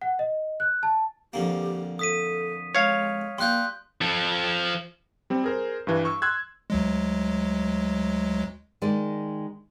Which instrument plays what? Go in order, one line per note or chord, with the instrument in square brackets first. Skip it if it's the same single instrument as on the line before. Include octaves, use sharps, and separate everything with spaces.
[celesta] F#5
D#5
F#6
A5
[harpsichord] F2 D3 A#3 [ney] G4
[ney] A4 [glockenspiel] D#6 B6 D#7
[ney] G#3 [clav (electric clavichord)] C#5 F5
[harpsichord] G3 F4 [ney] A#3 [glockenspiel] C6 F#6 G6
[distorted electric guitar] F3 A4
[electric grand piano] G3 C4
G#4 A#4 C5
G2 E3
C#6 E6
C6 E6 F#6 G#6
[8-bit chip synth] D2 F#3 G#3
[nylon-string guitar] D#3 G#3 D5